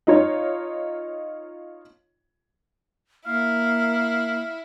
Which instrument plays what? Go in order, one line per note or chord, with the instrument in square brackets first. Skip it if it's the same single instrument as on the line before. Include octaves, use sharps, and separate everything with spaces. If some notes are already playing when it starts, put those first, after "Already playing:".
[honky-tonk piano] D#4 F4 C#5
[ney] A#3 [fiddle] E4 [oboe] F5